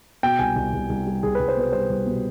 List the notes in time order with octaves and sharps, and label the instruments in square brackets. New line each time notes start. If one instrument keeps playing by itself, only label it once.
[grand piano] B2 G5
C2 G#5
C2
C2
C2
G3
C2 G#4
C2 B4
C5
B2 B4
G3 C5
C2
B2